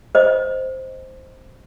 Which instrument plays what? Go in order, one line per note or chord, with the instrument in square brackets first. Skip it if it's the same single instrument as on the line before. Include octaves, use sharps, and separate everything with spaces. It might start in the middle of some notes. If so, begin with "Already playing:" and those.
[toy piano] C5 D#5